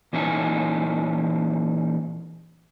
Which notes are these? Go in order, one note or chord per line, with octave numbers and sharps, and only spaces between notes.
A#2 E3 C#4 D#4 C5 G#5